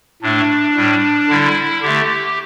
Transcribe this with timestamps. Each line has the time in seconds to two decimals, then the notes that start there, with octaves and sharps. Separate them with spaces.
0.22 A2 A3 D4
0.76 A2 G3
1.29 D3 G3 E4
1.82 D3 A3 G4